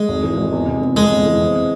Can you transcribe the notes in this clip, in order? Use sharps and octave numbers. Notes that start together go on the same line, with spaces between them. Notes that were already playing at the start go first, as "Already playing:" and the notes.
Already playing: G#3
G#1
E3
G#1
E2
C3
E2
F2 G#3
G1
E3
C4